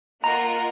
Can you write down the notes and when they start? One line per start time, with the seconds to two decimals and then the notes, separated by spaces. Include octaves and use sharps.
0.24 A#3 F4 A#4 D#5 F#5 A#5